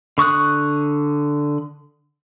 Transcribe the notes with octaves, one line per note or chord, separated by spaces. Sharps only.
D3 C#6 D#6 F#6